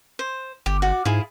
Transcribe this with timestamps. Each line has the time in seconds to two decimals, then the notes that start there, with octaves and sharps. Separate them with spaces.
0.19 C5
0.66 G1 G4
0.82 F#4 D5
1.05 G#2 E4 F4 G#4